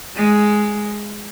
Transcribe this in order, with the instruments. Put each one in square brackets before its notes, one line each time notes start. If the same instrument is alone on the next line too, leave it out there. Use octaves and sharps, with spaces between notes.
[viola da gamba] G#3